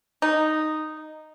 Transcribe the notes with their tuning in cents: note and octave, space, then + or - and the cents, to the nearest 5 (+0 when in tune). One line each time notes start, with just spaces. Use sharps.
D#4 -5